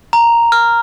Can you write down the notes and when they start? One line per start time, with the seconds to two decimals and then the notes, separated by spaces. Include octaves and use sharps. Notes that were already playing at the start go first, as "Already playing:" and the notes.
0.13 A#5
0.52 F6